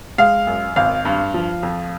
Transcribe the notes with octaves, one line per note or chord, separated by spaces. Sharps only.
G#3 F5
F#2
G#1 F5
G2
F3
F2